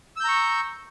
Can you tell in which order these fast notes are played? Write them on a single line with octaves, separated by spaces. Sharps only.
E6 G6 A#5 C#6